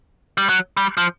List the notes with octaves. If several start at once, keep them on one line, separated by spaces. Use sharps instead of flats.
G3
F#3
G3
F3